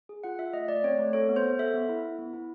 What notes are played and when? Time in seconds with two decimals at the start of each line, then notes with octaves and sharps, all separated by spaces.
0.09 G#4
0.24 F4 F#5
0.39 F4 E5
0.53 A3 D#5
0.68 A3 D5
0.84 C4 C#5
0.99 A3
1.13 A4 C#5
1.29 B3
1.36 C5
1.43 B3
1.59 A4 E5
1.74 B3
1.89 E4
2.03 E4
2.19 B3
2.34 E4